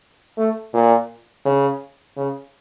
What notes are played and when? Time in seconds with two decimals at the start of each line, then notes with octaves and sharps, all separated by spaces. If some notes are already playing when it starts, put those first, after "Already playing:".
0.38 A3
0.74 A#2
1.45 C#3
2.17 C#3